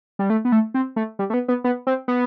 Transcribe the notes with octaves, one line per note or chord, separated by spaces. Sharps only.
G3
A3
B3
A3
C4
A3
G3
A3
B3
B3
B3
C4
B3